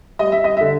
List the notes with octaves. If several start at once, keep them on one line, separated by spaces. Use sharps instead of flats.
G3 D#5
E5
D#5
D3 E5